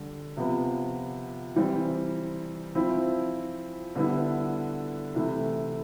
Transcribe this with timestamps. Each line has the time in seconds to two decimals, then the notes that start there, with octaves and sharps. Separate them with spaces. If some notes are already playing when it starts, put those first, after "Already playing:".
Already playing: D3 G3
0.37 C3 F3 B3
1.56 E3 G3 C4
2.75 F3 C4 E4
3.95 D3 G3 B3 E4
5.14 C3 E3 A3 E4